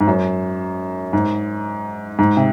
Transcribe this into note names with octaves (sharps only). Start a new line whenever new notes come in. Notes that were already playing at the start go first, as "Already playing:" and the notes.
G#2
F#2
G#2
G#2
C3